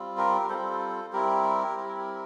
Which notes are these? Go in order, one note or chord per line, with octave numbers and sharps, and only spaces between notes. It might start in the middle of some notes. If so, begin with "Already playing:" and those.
Already playing: G3 C4 F4
G4 A#4
G3 C4 F4 A4 C5
G3 C4 E4 G4 A#4
G3 C4 E4